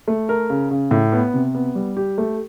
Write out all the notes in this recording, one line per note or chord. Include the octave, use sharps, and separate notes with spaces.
A3
A#4
C#3
C#3
A2
B3
C3
B3
G3
G4
A3